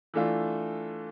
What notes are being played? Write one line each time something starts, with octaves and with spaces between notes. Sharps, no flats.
E3 A3 D4 F4